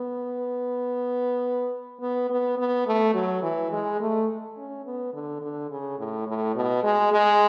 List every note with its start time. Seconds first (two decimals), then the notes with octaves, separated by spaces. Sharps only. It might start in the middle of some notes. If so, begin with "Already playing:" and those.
Already playing: B3
2.00 B3
2.30 B3
2.57 B3
2.87 A3
3.14 F#3
3.42 E3
3.71 G#3
4.00 A3
4.57 C#4
4.85 B3
5.14 D3
5.41 D3
5.70 C#3
5.98 A2
6.27 A2
6.55 B2
6.83 G#3
7.12 G#3